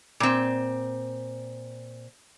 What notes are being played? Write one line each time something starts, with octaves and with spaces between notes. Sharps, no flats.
A#2 C4